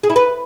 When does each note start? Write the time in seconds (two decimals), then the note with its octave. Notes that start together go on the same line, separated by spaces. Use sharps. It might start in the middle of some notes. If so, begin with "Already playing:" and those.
0.03 G#4
0.10 E4
0.16 B4